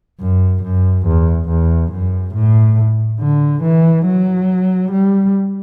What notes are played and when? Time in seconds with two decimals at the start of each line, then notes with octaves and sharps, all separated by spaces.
0.20 F#2
0.63 F#2
1.06 E2
1.49 E2
1.92 F#2
2.34 A2
3.20 D3
3.63 E3
4.06 F#3
4.91 G3